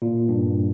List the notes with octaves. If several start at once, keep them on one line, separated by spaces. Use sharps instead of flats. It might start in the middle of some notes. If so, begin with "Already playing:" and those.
A#2
G2